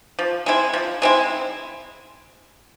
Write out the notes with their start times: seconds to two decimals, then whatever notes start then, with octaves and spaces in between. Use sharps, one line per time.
0.19 F3
0.46 G#3 C4 E4
0.73 F3
1.02 G#3 C4 E4